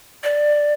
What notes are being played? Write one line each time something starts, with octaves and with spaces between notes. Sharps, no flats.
D5